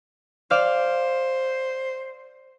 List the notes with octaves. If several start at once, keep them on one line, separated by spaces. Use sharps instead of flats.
C5 D5 F5